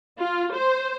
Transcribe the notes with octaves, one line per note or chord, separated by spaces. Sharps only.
F4
C5